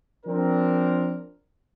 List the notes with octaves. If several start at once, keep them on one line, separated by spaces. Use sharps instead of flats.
F3 C4 D4 A#4